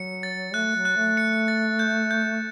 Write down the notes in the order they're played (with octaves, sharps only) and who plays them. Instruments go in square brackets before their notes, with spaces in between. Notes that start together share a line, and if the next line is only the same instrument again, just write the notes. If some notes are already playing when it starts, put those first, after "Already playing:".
Already playing: [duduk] F#3 [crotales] C#7
[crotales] A6
[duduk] A3 [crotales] F#6
[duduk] F#3
[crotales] F#6
[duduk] A3
[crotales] C#7
A6
G6
G6